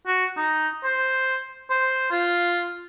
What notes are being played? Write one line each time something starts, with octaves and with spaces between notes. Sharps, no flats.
F#4
D#4
C5
C5
F4